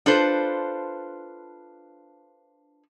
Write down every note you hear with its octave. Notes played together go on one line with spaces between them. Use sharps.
D4 F4 A4 B4 C5